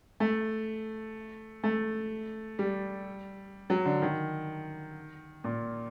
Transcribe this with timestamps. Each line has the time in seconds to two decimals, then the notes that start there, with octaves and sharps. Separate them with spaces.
0.20 A3
1.63 A3
2.59 G3
3.70 F#3
3.86 D3
4.02 D#3
5.44 A#2